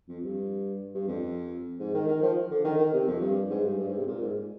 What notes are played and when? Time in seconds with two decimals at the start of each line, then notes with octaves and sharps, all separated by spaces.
0.09 F2
0.23 G2
0.95 G2
1.08 F2
1.80 G#2
1.94 D#3
2.08 D#3
2.22 F3
2.51 D3
2.64 D#3
2.78 D#3
2.93 C3
3.07 F2
3.21 G2
3.50 G#2
3.65 G2
3.78 G2
3.88 G#2
3.98 C3
4.07 A#2
4.21 G#2